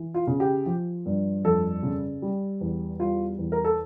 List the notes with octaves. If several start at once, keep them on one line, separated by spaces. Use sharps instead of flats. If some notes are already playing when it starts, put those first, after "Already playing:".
Already playing: E3
F4
C#3
G4
F3
G2
F2 A4
C#3
G3
E2
G3 F4
E2
A#4
A4